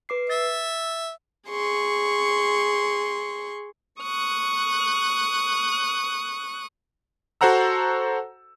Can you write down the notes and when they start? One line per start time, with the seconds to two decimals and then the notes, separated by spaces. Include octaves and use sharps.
0.09 B4 D6 C7
0.30 E5 A6
1.49 G#4 C6 C#6
4.01 C#6 D#6 F#6
7.41 F#4 A4 C5 F#5 A#5 E6